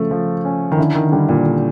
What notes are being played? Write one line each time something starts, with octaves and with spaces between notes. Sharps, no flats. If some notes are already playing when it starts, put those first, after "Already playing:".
Already playing: C#3 F3 A3
F3
C#4
D#3
D3 E4
D#3
D3 G3
A#2
D3